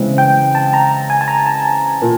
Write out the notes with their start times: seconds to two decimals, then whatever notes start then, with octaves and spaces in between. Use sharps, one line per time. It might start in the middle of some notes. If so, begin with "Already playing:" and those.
Already playing: C#3 E3 G#3 C4
0.18 G5
0.55 A5
0.73 A#5
1.10 G#5
1.21 A5
1.28 A#5
1.46 A5
2.02 A#2